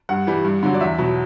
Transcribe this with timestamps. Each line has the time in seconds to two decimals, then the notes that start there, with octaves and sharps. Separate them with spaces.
0.09 G2 F#5
0.27 E3 G3
0.45 G2
0.63 D3 F#3
0.74 D5
0.81 E2 E5
0.98 B2 F#3